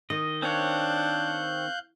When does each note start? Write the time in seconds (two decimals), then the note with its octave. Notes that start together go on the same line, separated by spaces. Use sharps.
0.10 D#3 D#5
0.42 C4 D4 C#5 F5 F#6 G6